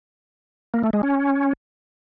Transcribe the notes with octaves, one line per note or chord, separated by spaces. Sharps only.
A#3
A3
G#3
C#4